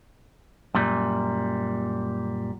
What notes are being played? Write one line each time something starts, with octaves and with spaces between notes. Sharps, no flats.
F#2 A#2 G3